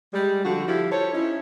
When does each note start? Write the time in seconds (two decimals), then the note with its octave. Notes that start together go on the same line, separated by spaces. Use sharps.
0.13 G3 G#3
0.44 D3 F3 F#4
0.67 F3 E4 F4 G4
0.92 A4 C5 C#5
1.13 C#4 D#4 E4